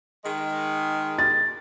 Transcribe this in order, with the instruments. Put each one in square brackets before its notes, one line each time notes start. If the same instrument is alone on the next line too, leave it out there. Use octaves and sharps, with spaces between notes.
[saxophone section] D#3 G#3
[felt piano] A6